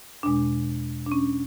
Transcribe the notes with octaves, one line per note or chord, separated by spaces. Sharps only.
E2 B2 G#3 D4
D4
C#4